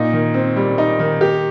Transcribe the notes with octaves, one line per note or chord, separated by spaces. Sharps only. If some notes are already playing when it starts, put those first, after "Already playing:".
Already playing: A#2 D#4
D#3
C4
G3
D#4
D#3
G4